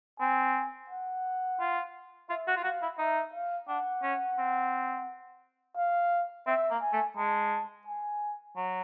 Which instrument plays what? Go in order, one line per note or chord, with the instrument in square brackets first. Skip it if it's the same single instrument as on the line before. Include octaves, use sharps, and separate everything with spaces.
[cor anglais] C4 [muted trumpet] G#5
[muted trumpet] F#5
[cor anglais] F4
[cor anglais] F4 [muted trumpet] E5
[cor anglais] F#4
F4
[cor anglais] F#4 [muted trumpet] F5
[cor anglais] E4
[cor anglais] D#4 [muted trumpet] E5
[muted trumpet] F5
[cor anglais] D4 [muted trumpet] F#5
[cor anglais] C#4
C4
[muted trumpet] F5
[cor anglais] C4 [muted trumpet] E5
[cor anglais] A#3
[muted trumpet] G#5
[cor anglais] A3
[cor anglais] G#3 [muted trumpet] A5
[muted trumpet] G#5
[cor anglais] F#3